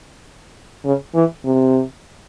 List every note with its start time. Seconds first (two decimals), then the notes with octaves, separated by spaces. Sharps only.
0.85 C#3
1.14 E3
1.45 C3